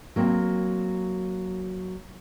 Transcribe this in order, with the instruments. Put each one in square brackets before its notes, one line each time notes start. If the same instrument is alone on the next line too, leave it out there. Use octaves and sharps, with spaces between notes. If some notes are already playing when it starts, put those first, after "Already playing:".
[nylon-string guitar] F#3 A#3 C4